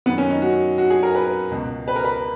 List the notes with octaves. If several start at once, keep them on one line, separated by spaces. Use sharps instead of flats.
F#2 D#3 B3
C#4
D#4
F#4
F#4
G#4
A#4
B4
C#2 B2
B4
A#4
B4